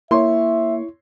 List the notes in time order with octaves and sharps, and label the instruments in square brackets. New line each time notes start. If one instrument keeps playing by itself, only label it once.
[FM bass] A#3 [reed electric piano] E4 [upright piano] C#5 C6 [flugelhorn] E5